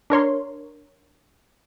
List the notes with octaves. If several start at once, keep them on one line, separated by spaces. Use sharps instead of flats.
D4 A#4 C#5 C6